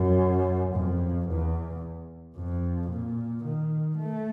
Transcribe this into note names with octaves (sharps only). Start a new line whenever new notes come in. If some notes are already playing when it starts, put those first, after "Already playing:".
Already playing: F#2
F2
E2
F2
A#2
D#3
A3